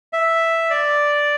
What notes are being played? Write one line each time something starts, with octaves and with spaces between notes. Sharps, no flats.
E5
D5